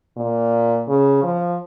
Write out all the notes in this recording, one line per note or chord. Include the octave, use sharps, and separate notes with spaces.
A#2
C#3
F3